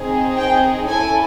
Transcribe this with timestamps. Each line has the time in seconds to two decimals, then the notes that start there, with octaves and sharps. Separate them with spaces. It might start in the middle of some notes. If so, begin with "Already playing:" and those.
Already playing: C4 D#4 G#4
0.37 G5
0.88 C#4 E4 A4 G#5